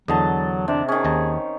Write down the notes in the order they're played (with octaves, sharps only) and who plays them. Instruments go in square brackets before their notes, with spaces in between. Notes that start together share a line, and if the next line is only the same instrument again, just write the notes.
[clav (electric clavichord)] E2 D3 [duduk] F#3 [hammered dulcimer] D#5 A5
[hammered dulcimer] C3 [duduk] D4
[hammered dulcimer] D#3 C#4 [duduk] G#4
[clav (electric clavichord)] D#2 D#5 A5